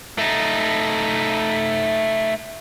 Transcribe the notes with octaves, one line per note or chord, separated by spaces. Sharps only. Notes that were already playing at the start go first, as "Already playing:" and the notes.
A3 D#4